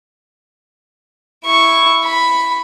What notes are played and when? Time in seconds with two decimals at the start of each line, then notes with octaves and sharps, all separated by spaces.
1.45 E4 C#6
2.04 B5